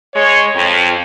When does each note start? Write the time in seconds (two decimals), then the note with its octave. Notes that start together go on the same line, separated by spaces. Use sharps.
0.15 G#3 C#5
0.56 F2